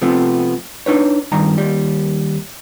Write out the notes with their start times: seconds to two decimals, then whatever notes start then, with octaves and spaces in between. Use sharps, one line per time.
0.02 C3 F3 A3 B3
0.86 D4 D#4 B4 C#5
1.32 G2 D#3 A#5
1.57 D#2 G3